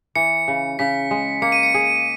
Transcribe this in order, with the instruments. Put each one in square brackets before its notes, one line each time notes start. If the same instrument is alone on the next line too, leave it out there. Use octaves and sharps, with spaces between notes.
[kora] E3 [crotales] C#7
[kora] C#3
[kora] C#3 [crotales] B6
[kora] G#3
[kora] A#3 [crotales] C#7
[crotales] D#7
C#7
[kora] G#4